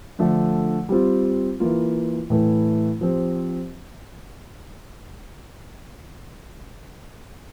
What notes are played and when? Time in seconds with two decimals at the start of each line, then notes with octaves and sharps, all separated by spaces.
0.19 D3 F3 A3 D4
0.89 G3 C4 F4
1.60 E3 A#3 F4
2.30 A2 E3 A3
3.01 F3 C4 G4